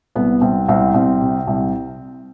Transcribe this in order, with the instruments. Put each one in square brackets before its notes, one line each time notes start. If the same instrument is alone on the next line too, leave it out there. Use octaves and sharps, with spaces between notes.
[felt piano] C2 B3
C2 C4
C2 C4
C2 C4
C3
C2